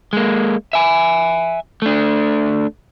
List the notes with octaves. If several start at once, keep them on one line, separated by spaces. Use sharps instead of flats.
G#3 A#3
E5 G#5
A3 D4